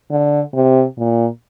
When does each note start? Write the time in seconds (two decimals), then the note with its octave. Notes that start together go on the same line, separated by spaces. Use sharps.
0.11 D3
0.54 C3
0.97 A#2